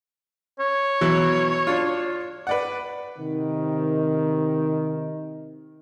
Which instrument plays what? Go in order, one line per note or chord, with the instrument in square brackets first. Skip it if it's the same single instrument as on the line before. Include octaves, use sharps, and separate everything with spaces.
[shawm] C#5
[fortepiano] B2 E3 F#3
D4 F4
B4 D5 F#5
[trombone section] C3 D#3